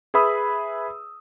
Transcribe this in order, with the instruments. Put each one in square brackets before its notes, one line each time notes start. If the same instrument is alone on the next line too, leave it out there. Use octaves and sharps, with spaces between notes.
[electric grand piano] G#4 B4 E5 B5 D#6 E6